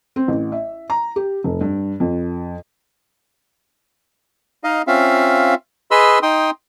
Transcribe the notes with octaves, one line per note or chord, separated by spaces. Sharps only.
C4
A1
E5
A#5
G4
F1
G2
F2
D#4 D#5 F5
C4 C#4 F4 E5 F5
G#4 B4 D#5 B5 C6 E6
D#4 G5 C6 D#6